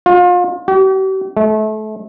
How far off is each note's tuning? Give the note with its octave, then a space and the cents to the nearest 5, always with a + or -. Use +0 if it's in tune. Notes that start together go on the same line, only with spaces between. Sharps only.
F4 +35
G4 -45
A3 -30